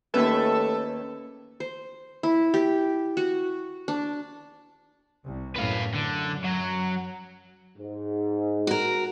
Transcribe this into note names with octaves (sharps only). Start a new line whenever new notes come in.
D#2 A3 C#4 A4 B4 E5
C5
E4
G4
F#4
D4
C2
F#2 A2 B4 F5
F#2 D3
F#3
G#2
F#4 A#4